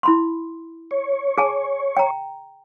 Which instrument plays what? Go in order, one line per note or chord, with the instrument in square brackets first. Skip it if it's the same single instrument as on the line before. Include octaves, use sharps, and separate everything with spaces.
[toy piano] E4 B5 C6
[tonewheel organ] C#5
[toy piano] G#4 G#5 A5
G5 A#5